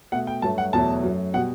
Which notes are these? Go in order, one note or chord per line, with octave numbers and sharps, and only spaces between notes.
B2 A3 F#5
G5
G2 F#3 A3 A5
F#5
E2 B2 F#3 A3 A5
F#2 F#3 A3
B2 G3 F#5